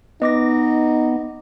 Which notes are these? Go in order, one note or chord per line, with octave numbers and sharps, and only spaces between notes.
B3 D#4 D#5 D6 A#6